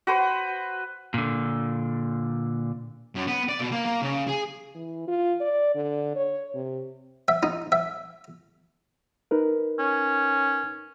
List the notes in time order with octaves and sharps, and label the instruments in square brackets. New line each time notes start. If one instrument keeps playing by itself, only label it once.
[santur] F#4 B4 C5
[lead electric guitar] A#2 D3
[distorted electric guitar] F#2
B3
D5
B2
A#3
A#3
C#3
G#4
[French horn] E3
F4
D5
D3
C#5
C3
[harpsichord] E5
D#4
E5
[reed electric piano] D#4 A#4 B4
[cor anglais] C#4